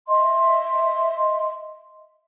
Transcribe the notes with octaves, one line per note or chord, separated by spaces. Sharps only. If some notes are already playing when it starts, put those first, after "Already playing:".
D#5 E5 C6